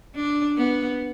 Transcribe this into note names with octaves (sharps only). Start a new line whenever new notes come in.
D4
B3